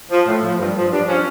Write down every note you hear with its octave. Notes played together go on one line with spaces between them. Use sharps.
F3
A2
F3
G2
F3
G2 D4
F3 C#4